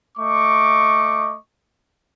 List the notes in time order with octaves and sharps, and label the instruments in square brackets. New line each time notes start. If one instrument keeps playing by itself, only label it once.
[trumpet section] A3 D#5 C#6 D6